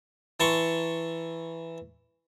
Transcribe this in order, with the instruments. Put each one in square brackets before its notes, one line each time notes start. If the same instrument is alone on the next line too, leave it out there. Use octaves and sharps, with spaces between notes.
[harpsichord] E3 A5 A#5 C6 C#6